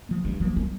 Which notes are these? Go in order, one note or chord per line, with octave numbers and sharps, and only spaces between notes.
F3 A#3
G2 G#3
F3 G3 A#3
G3